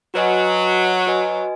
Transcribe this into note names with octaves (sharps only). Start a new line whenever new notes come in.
F#3 F#4 B4 D#5 G#5
F#4 B4 D#5 G#5